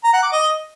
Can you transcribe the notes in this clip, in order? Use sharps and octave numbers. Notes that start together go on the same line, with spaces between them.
A#5
F#5
D6
D#5